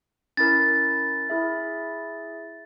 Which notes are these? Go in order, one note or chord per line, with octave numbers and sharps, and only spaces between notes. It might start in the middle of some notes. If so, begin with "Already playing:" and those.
C#4 E4 A#4 A6
E4 G#4 E5